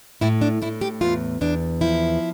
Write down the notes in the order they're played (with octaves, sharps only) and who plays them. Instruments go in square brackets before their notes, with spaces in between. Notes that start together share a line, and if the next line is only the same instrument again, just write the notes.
[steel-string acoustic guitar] A2 E4
D4
A2 E4
G4
E2 F4
E2 D4
F3 E4